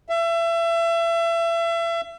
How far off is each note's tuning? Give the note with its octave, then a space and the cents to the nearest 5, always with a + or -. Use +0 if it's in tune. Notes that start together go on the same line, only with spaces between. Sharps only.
E5 +30